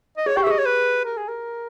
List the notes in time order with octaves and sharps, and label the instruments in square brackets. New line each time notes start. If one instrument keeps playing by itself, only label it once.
[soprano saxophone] D#5
[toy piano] G#4 [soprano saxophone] C#5
[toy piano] G4 [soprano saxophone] G5
[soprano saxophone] E5
[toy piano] G#4 [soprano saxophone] D#5
[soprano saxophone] C#5
B4
A#4
G#4
A#4